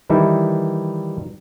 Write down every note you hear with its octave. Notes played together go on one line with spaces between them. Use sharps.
D#3 E3 G3 D#4 E4 A4